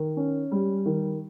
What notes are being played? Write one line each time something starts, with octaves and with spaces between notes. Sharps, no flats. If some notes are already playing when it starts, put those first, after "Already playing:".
Already playing: D#3
C#4
G3
D#3